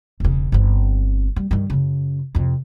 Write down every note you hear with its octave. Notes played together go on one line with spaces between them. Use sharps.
E1 C#3
G1 C4
G3
G2 D#3
F#2 C#3
F2 C3